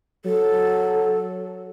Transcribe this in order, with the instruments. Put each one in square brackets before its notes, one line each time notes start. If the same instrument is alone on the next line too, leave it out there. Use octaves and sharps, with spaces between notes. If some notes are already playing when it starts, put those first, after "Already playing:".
[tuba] F#3 [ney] A4